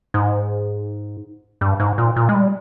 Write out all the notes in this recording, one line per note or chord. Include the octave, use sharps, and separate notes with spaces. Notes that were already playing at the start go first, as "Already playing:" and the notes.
G#2
G2
G#2
A#2
A#2
G#3
G3